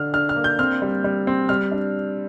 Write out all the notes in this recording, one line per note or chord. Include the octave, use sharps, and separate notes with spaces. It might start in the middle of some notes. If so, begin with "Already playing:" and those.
Already playing: D3 D4 F6
D4 F6
F6
A#3
G6
C4 F6
G3
G3
C4
G3 F6
D4